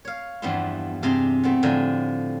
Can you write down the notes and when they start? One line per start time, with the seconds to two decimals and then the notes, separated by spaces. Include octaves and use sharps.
0.05 C#5 F5
0.42 E2 G2 F3 B3 E4 C6
1.03 G2 C3 C4 G4 G#4 C6
1.44 A3 B3 C4
1.63 A2 D3 F3 G#5 A#5